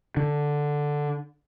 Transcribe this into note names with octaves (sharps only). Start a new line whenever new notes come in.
D3